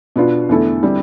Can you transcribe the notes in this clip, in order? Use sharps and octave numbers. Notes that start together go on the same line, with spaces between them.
B2 B3 D4 F4
E2 D3 A3 E4 A4
D3 G3 C4 E4